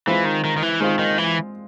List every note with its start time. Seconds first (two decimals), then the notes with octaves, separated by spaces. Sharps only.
0.07 E3 G#3 C4 F4
0.25 D#3
0.44 D#3
0.57 D#3
0.63 E3
0.80 D#3 G#3 C4 F4
0.99 D#3
1.18 E3